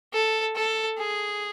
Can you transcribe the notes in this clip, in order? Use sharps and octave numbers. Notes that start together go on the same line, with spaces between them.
A4
A4
G#4